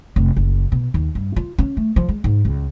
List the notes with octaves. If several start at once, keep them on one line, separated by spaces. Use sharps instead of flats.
F1
F#1
B2
D#2
G2
F4
C#4
A3
F3
G#3
G#2
C#2